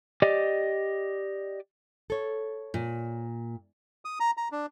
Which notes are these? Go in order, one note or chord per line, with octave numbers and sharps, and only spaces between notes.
G4 D5 D#5
A4 C#5
A#2
D#6
A#5
A#5
D4